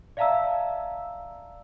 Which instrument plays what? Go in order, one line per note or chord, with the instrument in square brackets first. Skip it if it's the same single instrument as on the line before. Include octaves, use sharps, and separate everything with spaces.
[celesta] D5 E5 F5 A5 A#5 E6